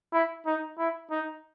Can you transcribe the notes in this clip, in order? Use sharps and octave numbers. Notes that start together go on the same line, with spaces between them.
E4
D#4
E4
D#4